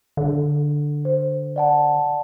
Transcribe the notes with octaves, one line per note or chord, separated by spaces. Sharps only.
D3
C5
D5 F#5 A5